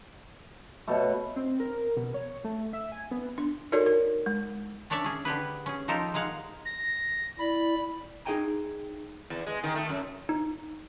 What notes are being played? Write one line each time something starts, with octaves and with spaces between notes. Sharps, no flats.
B2 A3 C#5 E5 B5
C4
A#4
B2
C#5
A3
E5
G#5
B3
D4
D#4 F#4 A4 A#4 C#5 D5
A#4
G#3
C#4 D4 C#5 D5 E5
C#4 G#4
D3 G4 G#4 B4
C#4 G#4
F3 D#4 G4 A4 A#4 C5
G#3 A#3 G#4 F5 F#5
A#6
E4 D5 B5
D#4 G#4 D#5 G5 G#5 A#5
E2
G#3
D#3
A3
F#2
D#4